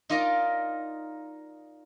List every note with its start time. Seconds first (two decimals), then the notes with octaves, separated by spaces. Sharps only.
0.09 D#4 F4 A#4 D5 D#5